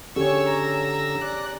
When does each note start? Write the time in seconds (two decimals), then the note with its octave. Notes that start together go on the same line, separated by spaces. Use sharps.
0.16 D3 C#4 G4 G#4 C#5 C#6 E6
0.49 A#5
1.22 D5 F#6